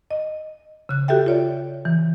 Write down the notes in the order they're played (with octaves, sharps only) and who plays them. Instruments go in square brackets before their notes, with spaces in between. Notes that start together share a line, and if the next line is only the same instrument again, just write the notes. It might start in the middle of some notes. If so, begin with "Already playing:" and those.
[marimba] D#5
C#3 F#6
F#4 G4 A4 E5 G5
F4 C#5 D5
E3